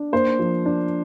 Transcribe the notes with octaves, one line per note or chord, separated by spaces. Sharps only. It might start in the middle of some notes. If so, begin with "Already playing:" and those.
Already playing: D4
A#3 C5
F3
D4